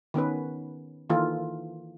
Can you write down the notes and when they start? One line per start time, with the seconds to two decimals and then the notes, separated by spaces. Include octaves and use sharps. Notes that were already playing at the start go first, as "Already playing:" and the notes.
0.14 D#3 B3 C#4 B4
1.10 D#3 E3 A#3 F4 A4